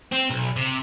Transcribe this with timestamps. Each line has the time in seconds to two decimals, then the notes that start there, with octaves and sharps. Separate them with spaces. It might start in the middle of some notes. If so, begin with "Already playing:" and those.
0.12 C4
0.30 B1
0.56 C3